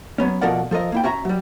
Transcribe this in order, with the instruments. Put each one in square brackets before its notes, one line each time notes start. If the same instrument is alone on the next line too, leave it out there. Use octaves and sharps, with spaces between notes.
[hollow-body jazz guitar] F#3 B3 C#4
B2 F3 A4 A#4 D5 F#5
F3 A4 A#4 D#5
A#3 E4 G5
C#4 F#4 E5 A#5
F#3 G3